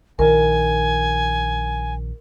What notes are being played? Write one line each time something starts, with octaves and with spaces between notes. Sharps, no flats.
A#1 D#3 A#4 G#5